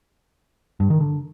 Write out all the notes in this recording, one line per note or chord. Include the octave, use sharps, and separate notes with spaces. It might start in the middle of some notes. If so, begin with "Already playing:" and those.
G2
D#3
D3